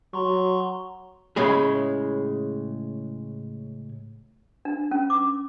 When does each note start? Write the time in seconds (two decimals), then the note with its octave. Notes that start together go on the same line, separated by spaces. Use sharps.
0.13 F#3 A#5 C6 C#6
1.36 A2 C#3 G#3 G#4
4.65 D4
4.91 C#4
5.10 D6